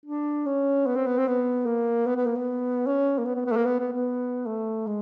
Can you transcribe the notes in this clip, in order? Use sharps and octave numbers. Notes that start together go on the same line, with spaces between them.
D4
C#4
B3
C4
B3
C4
B3
A#3
B3
B3
A#3
B3
C#4
A#3
B3
B3
B3
A3
A#3
B3
B3
B3
A3
G#3